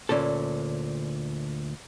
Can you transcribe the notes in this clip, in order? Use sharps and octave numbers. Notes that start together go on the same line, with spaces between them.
D2 A#2 C#4 A4